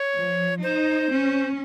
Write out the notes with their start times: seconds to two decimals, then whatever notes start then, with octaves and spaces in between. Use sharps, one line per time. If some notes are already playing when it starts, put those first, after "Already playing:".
Already playing: C#5
0.16 F3
0.63 D#4 C5
1.11 C#4